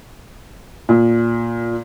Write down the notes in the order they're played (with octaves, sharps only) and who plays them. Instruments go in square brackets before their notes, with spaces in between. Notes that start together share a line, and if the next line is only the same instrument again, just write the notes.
[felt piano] A#2